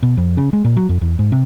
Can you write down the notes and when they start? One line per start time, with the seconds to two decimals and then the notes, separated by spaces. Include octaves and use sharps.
0.03 B2
0.17 F2
0.37 C#3
0.53 G#3
0.64 A#2
0.77 F#3
0.89 F2
1.01 E2
1.19 G#2
1.32 C3